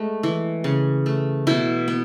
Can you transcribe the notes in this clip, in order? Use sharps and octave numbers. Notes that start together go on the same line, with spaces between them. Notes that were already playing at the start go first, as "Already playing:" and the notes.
Already playing: G#3 A3
E3
C#3
A3
B2 E4
B3